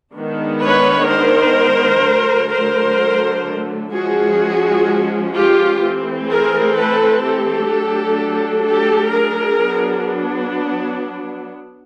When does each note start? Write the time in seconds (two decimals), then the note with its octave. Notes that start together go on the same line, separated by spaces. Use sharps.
0.14 D#3 G#3 B3 D4
0.62 B4 C#5
1.09 A#4 C5
2.03 D3 F#3 A3
2.50 A#4 C5
3.92 F3 G#3 C#4 F#4 G#4
5.34 F4 G4
5.80 E3 A3 C4
6.28 G#4 A#4
6.75 A4 B4
7.22 G4 A4
7.69 F#3 A3 D4
8.64 G4 A4
9.11 G#4 A#4
9.59 F#3 B3 D4